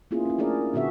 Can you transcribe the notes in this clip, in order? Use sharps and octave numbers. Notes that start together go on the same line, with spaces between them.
A#3 B3 C#4 E4 F4 G#4
C#4 E4
A3 D4 G#4 A#4 D5
A#2 D3 B3 F#4 G#4 E5